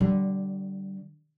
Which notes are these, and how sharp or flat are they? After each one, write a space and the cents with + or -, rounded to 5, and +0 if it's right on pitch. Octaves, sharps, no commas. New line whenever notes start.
D3 +0 G3 -25